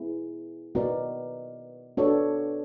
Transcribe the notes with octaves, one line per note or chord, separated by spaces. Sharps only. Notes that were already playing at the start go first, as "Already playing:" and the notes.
Already playing: B3 E4 G#4
B3 D#4 F#4 A#4 D5
B3 D4 F#4 A4 C#5